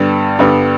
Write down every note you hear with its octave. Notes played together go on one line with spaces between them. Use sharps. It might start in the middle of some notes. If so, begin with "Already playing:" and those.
Already playing: G2 D3 G3 B3
G2 D3 G3 B3